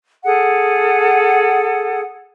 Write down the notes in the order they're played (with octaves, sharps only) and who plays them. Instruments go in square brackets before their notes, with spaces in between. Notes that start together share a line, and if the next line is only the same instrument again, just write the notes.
[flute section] G#4 A4 F#5